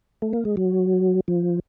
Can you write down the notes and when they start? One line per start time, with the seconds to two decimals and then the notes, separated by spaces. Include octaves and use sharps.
0.22 A3
0.33 A#3
0.45 G#3
0.57 F#3
1.28 F3